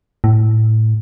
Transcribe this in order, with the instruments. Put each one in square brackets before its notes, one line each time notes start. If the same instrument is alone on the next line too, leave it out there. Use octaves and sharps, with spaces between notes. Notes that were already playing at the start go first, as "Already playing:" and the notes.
[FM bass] A2